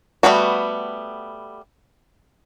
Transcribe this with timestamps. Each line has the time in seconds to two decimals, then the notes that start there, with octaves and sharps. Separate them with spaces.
0.23 G3 A3 B3 C4 F#4